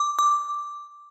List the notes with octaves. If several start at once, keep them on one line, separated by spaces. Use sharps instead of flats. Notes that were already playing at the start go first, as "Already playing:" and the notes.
Already playing: D6
D6